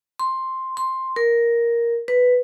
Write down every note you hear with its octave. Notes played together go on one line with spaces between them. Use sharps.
C6
C6
A#4
B4